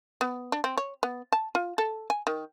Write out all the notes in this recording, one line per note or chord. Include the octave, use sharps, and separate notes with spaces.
B3
D4
C4
C#5
B3
A5
F4
A4
G#5
D#3